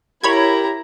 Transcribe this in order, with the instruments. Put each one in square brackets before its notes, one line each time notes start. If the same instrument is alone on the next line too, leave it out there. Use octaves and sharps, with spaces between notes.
[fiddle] E4 A#5 [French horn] G4 [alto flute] A#4 [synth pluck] C#5 B5 G#6